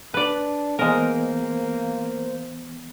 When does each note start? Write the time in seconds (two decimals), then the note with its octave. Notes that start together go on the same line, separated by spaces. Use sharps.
0.14 D4 B4 D5
0.79 E3 G#3 A#3 B3 A#4 C5